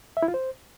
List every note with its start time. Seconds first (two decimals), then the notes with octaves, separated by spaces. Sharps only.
0.17 E5
0.23 E4
0.28 F4
0.34 C5